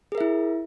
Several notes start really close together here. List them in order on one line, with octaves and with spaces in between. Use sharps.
G#4 A#4 E5 E4